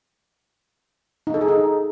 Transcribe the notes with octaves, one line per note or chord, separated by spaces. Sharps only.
D#4
A4
G#4
D#4